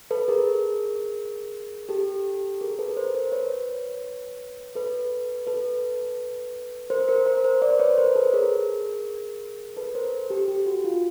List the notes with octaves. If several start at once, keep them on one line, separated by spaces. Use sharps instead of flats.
A4 B4
G#4 A#4
G4 A4
G#4 A#4
A4 B4
A#4 C5
A#4 C5
B4 C#5
A4 B4
A4 B4
A#4 C5
A#4 C5
A#4 C5
A#4 C5
C5 D5
B4 C#5
A#4 C5
A4 B4
G#4 A#4
A4 B4
A#4 C5
G4 A4
G4
F#4
F4